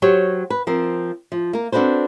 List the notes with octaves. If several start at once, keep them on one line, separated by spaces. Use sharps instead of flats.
F#3 G4 C5 C#5
B4
F3 C4 A#4
F3
A#3 A#4
C4 D4 F#4 A4 B4 C5